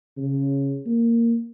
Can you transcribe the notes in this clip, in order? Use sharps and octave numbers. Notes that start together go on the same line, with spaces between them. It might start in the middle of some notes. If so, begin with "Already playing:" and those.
C#3
A#3